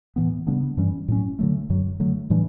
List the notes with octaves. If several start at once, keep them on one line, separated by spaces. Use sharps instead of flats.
A2 E3 B3
C#3 G3 B3 D4
G2 E3 G3 C#4
A2 F#3 C#4
D3 F#3 A3
F#2 D3 F#3
D3 F#3 A3
A2 E3 G3 D4